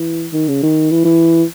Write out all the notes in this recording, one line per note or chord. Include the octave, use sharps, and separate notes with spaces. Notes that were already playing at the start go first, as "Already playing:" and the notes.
Already playing: E3
D#3
C#3
D#3
E3
E3